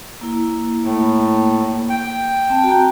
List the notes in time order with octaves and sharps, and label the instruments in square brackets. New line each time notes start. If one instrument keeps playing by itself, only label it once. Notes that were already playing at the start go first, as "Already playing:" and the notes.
[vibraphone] A#3 E4
[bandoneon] A2 [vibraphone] A#3
[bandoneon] G5
[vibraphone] C4 A5
F#4 A#5